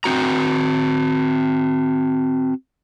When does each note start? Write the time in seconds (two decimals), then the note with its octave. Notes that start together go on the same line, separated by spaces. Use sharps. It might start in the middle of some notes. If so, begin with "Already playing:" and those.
0.04 C4 F#4 A#5